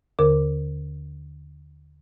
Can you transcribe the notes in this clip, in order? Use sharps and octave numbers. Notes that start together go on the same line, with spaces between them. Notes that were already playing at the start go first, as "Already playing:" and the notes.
D#2 D3 A#4 D6